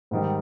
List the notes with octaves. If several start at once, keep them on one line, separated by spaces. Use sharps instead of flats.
G#2 D#3 G3